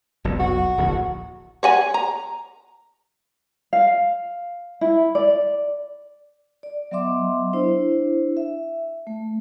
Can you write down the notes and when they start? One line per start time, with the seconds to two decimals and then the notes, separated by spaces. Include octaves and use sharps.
0.24 F1 B1 F2
0.40 F#4
0.78 D1 A#1
1.63 C#5 F#5 G#5
1.94 A#5
3.73 F5
4.81 E4
5.15 D5
6.63 D5
6.91 F#3 B3 D#5 E5 C6 D6
7.53 D4 E4 C5
8.37 E5
9.07 A3